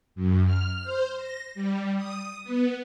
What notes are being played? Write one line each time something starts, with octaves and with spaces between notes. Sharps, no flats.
F#2
F6
C5
A#6
G3
D#6
B3